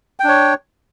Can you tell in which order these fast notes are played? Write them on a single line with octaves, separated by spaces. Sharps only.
G5 D4 C#5